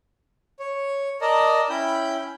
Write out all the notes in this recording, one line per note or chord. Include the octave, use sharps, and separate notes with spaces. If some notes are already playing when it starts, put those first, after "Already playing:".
C#5
A#4 D5 D#5 A5 A#5
C#4 E4 G5 B5 G6